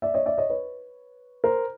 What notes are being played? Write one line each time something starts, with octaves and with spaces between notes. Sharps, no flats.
D5 E5
C#5 D#5
D5 E5
C#5 D#5
B4 C#5
A#4 C5